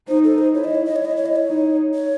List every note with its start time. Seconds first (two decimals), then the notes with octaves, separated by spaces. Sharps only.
0.08 D#4 C5
0.24 A4
0.38 C5
0.54 E4 C#5
0.64 D#5
0.75 C#5
0.85 D#5
0.96 C#5
1.01 E4 D#5
1.16 C#5
1.26 D#5
1.36 C#5
1.48 D#4
1.94 C#5